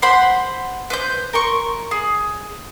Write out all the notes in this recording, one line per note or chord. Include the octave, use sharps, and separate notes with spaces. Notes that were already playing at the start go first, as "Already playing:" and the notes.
C5 F#5 B5 C6
B4 C5 G6
A#4 C6 C#6
G#4